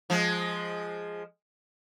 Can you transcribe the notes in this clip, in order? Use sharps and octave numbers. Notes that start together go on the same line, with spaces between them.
F3 G#3